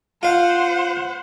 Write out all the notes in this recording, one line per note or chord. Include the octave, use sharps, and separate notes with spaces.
F4 C5 F5 F#5